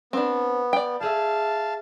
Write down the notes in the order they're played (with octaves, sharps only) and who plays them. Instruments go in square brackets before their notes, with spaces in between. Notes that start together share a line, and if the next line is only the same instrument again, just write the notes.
[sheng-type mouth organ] B3 [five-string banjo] C4 D4
[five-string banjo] D5 G5
[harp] G4 G#4 E5 [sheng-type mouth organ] F5 A5